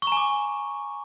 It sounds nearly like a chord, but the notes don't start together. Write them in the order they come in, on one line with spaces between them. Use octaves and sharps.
C#6 A#5 G#5 D6